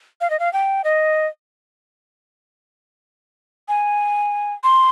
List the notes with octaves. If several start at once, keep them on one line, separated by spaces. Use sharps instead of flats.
F5
D#5
F5
G5
D#5
G#5
C6